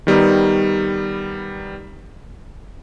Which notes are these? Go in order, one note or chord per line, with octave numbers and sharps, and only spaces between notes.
D#3 G3 B3 D#4